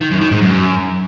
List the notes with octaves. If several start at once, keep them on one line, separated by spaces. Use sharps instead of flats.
D#3
F#2
D#3
G#2
F#2